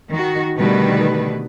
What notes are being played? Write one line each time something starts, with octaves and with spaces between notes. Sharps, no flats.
D#3 F#4
B2 D3 D#3 G3 A3 B4